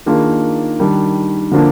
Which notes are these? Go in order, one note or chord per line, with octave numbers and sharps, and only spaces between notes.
D#3 A#3 D4 F4 G#4
D#3 G3 D4
D3 F3 A#3 D4